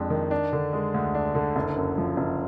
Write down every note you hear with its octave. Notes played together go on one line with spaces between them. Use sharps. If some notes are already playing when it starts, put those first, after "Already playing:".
Already playing: F2 G#3 D4
D#3
D4
D3
G#3
D2
D4
D3
F#1
F#2
F3
F#1